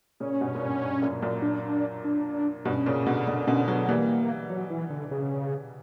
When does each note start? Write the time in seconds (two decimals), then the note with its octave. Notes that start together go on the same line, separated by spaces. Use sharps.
0.20 A#2 C#3 C#4
0.41 G2 B2
0.55 A#2
0.61 G2
0.82 G2
1.02 F#2 A#2
1.22 F#2 A#2
1.42 D4
2.04 D4
2.65 G2 B2 C#4
2.86 A#2 C#3
3.06 B2 D3
3.27 B2 D3 D4
3.47 B2 D3 C#4
3.68 D3 F#3 B3
3.88 E3 G3 A#3
4.50 F#3
4.70 E3
4.90 D3
5.11 C#3